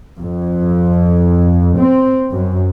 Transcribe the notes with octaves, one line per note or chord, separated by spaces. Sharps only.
F2
C4
F#2